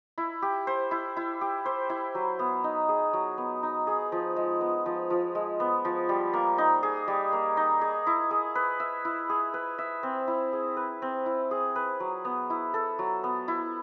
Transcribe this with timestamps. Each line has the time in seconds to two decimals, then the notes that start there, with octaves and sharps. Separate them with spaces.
0.18 E4
0.42 G4
0.67 C5
0.91 E4
1.17 E4
1.41 G4
1.65 C5
1.90 E4
2.15 F#3
2.39 B3
2.64 D#4
2.89 G#4
3.13 F#3
3.38 B3
3.63 D#4
3.87 G#4
4.12 F3
4.36 G#3
4.61 B3
4.86 F3
5.10 F3
5.35 G#3
5.60 B3
5.85 F3
6.09 G3
6.33 A#3
6.58 D#4
6.83 G#4
7.08 G3
7.33 A#3
7.57 D#4
7.81 G#4
8.07 E4
8.31 G#4
8.55 B4
8.80 E5
9.05 E4
9.30 G#4
9.54 B4
9.78 E5
10.03 C4
10.28 E4
10.53 G#4
10.77 B4
11.02 C4
11.26 E4
11.51 G#4
11.76 B4
12.00 F#3
12.25 B3
12.50 E4
12.74 A4
12.99 F#3
13.24 B3
13.48 E4